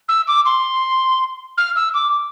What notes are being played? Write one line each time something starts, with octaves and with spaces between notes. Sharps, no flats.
E6
D6
C6
F6
E6
D6